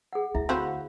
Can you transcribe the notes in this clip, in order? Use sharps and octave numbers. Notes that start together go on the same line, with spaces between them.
G#4 F#5
D2 E4 E5
C4 F#4 C5 F5 B5